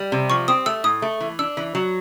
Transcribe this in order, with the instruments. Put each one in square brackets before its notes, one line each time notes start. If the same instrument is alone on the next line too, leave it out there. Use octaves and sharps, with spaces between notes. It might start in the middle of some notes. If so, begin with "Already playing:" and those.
Already playing: [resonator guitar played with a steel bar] G3
C3
[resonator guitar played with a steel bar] F3 [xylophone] C#6
[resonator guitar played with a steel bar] C4 [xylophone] D#6
[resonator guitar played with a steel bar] A3 [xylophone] E6
[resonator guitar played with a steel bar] A2 [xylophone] D#6
[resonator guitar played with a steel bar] A3
E3
[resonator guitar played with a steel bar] D4 [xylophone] E6
[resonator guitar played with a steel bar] E3
F#3